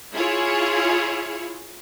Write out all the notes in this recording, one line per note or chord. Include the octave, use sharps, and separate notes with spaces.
E4 F4 G#4 C#5